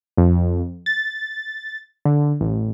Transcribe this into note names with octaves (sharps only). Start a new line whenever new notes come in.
F2
A6
D3
A1